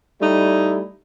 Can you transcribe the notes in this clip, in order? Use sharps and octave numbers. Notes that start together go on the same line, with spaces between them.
G3 A3 D#4 E4